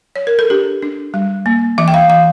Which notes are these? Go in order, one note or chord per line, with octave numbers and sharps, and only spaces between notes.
C#5
A#4
A4
D4 G4
D4
G3
A#3
E3 E5
G5
F5
E3 F5